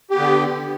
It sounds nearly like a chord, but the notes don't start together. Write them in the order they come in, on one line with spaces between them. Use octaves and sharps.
G4 B3 D3